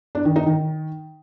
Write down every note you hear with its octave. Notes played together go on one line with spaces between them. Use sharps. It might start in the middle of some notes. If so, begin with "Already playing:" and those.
D4
D#3
D#4
D#3